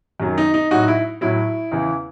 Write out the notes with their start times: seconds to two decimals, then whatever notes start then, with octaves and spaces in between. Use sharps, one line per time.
0.20 F#2 D#3 F#3
0.38 D#4
0.54 D#4
0.71 A2 F#3 D#4 F#4
0.88 E4
1.21 A2 F#3 E4
1.72 E2 C#3 E3